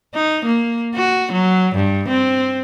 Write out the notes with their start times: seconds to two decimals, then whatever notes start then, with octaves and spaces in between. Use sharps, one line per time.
0.14 D#4
0.45 A#3
0.95 F#4
1.33 F#3
1.75 G2
2.09 C4